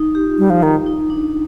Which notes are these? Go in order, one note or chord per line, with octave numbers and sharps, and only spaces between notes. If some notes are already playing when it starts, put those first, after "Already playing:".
Already playing: D#4
G4
F4
G3
F3
D#3
D#4
D4